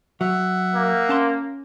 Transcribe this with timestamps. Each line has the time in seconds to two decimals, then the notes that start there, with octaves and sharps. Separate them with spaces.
0.21 F#3 E5 F#5
0.74 A#3
1.09 C#4 A5 C6